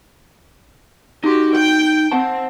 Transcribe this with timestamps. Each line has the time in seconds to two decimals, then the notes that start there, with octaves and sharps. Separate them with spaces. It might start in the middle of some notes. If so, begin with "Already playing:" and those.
1.24 D#4 F#4 G4 C6
1.54 G5
2.12 C4 C5 F#5 A5